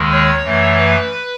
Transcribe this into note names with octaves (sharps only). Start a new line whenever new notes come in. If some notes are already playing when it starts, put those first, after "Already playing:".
Already playing: D#2 D#3 G#3
C#5
F#2 E3 A3
B4